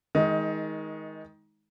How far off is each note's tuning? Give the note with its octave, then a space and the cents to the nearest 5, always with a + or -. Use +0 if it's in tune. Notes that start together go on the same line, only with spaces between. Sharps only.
D#3 +25 G#3 +0 D#4 +25